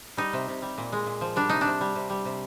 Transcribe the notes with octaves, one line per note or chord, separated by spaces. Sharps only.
G3 D#4
C3
C3
G3
A#2
G#3
A#2
F3
G3 D4
C3 D#4
D4
C3
G3
C3
G3
C3